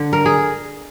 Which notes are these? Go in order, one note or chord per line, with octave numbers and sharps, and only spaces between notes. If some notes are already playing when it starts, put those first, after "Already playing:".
Already playing: D3
A#4
G#4